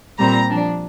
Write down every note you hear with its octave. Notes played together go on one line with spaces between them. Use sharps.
A#2 G3 C4 A#5
F3 D4